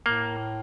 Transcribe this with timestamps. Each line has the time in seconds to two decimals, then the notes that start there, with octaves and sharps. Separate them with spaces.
0.06 A2 A#3